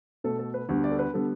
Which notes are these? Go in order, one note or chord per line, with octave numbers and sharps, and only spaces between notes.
B2 A3 A4
A4
B4
D2 D3 G3 B3
D5
A4
B4
D3 G3 B3 A4